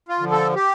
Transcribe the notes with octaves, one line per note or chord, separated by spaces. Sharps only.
F4
D3 F3
A4
G4